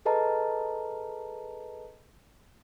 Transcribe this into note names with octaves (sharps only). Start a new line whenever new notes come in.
G#4 A4 B4 D#5 A5 A#5